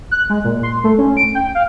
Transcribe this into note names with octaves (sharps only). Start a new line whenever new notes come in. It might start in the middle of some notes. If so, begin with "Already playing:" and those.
F#6
G#3
A#2
C6
A3
C#4
D7
G5
F5